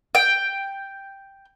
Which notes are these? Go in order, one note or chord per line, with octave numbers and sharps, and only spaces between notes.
G5